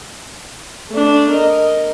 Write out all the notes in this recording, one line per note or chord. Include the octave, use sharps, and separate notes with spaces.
A3 D4
A#4 D#5